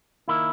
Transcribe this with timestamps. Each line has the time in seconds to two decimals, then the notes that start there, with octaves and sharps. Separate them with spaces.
0.28 D#3 A#3 E4